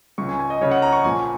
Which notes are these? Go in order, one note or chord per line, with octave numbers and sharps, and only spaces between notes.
C#2 C#3 C#6
G#5
G#5
D#5
C#2 C#3 C#5
F#5
A#5
C#6
A#1 A#2 G#5